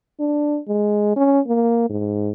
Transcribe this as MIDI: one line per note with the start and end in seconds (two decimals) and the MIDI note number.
0.20 0.59 62
0.68 1.14 56
1.16 1.40 61
1.47 1.87 58
1.89 2.32 44